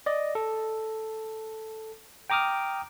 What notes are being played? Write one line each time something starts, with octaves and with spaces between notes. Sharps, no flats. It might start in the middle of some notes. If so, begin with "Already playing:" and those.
D5 D#5
A4
G5 A#5 D6 D#6 F6